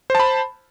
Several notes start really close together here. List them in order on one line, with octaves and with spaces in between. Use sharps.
C5 A5 B5